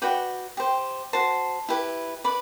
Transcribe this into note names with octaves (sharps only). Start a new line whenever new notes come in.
F#4 B4 D5 G5
G4 C5
F#4 C5 A5
E4 G4 B4
B4 D5 B5